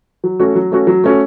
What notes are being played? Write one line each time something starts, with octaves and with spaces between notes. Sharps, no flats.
F#3
A3 C#4 F#4
F#3
A3 C#4 F#4
F#3
A3 C#4 F#4